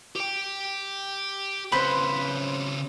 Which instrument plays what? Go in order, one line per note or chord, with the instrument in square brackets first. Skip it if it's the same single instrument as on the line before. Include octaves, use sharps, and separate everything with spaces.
[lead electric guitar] G4 G5
[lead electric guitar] C#3 C4 [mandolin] B4 C5